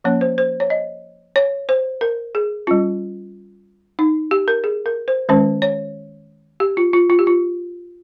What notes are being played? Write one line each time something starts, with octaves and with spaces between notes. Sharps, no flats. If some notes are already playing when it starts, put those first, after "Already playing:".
F3 A#3 C#4 C#5
C5
C5
C#5
D#5
C#5
C5
A#4
G#4
G3 C#4 F4
D#4
G4
A#4
G#4
A#4
C5
D#3 G#3 C#4 C5
C#5
G4
F4
F4
F4
G4
F4